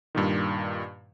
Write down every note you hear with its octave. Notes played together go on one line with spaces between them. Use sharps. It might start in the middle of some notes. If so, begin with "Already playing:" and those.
G2 A#2 D#3